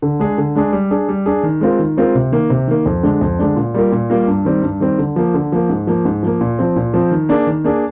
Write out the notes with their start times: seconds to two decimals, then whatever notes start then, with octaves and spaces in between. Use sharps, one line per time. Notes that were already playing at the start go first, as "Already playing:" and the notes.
0.02 D3
0.20 G#3 D4 G#4
0.38 D3
0.55 G#3 D4 G#4
0.73 G3
0.91 D4 G#4
1.09 G3
1.26 D4 G#4
1.43 D#3
1.61 G#3 C4 F4 A#4
1.79 D#3
1.97 G#3 C4 F4 A#4
2.15 C3
2.32 D#3 A#3
2.50 C3
2.68 D#3 A#3
2.86 F2
3.03 D3 G#3 D4
3.21 F2
3.39 D3 G#3 D4
3.56 A#2
3.74 G3 A#3 F4 A#4
3.92 A#2
4.10 G3 A#3 F4 A#4
4.28 G2
4.45 D#3 G3 C4
4.63 G2
4.80 D#3 G3 C4
4.99 D3
5.16 F3 A#3
5.34 D3
5.52 F3 A#3
5.69 G#2
5.87 F3 A#3
6.05 G#2
6.23 F3 A#3
6.41 A#2
6.59 F3 C4
6.76 A#2
6.94 F3 C4
7.11 D#3
7.29 A#3 D4 G#4
7.47 D#3
7.64 A#3 D4 G#4